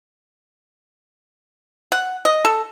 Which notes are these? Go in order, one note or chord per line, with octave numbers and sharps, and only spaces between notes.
F#5
D#5
A4